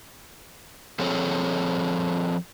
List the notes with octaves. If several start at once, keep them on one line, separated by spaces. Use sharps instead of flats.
F3 C4 G#4 A4 C#5